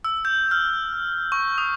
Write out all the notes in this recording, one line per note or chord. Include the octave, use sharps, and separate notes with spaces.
E6
G6
F6
C#6
D#6